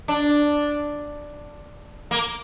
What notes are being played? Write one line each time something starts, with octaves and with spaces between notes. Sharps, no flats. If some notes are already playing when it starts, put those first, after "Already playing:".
D4
A#3